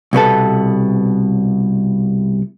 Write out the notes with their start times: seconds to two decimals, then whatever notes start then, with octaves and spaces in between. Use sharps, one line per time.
0.13 C2 B2 B3 A4